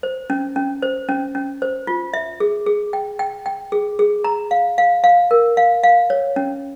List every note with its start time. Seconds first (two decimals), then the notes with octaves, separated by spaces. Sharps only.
0.03 C5
0.30 C#4
0.56 C#4
0.82 C5
1.09 C#4
1.35 C#4
1.62 C5
1.87 F4
2.14 E5
2.40 G#4
2.66 G#4
2.93 G5
3.19 G5
3.46 G5
3.72 G#4
3.99 G#4
4.24 A#5
4.51 F5
4.78 F5
5.04 F5
5.31 A#4
5.57 F5
5.83 F5
6.10 C#5
6.36 C#4